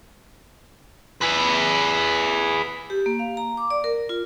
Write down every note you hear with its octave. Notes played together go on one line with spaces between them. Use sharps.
G#4 B4
G4
A#3
F5
A#5
D6
D5
A#4
F4